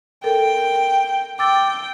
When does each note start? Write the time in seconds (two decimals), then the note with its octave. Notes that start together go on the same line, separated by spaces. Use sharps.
0.24 A4 A#4 G5
1.39 G5 D6 E6 A6